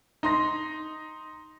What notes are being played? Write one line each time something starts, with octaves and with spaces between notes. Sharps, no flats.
D#4 C6 A#6